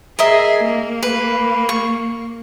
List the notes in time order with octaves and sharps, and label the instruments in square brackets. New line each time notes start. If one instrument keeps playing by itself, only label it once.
[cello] G#4 [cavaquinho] A#4 D#5 E5
[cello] A#3
[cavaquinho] B4
C#6